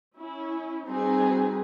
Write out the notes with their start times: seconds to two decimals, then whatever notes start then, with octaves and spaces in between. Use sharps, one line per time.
0.17 C#4 E4
0.86 G3 C4 D#4 F#4 G#4 B4